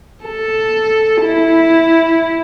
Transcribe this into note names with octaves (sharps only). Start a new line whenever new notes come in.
A4
E4